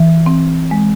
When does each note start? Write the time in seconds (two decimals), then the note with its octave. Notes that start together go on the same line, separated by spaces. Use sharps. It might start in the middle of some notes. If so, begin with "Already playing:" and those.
Already playing: E3
0.26 C4
0.71 G#3